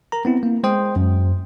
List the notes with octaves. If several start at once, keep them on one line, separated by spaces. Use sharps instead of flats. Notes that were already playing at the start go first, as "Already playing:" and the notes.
A#4 A#5
B3 C4 E4
A#3
G#3 C5 G5 D#6
F#2